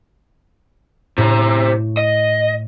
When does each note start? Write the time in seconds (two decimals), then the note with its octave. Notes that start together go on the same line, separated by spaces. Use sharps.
1.18 A2 C3 A#5
1.97 D#5